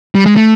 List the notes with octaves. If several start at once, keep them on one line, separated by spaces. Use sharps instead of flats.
G3
G#3
A3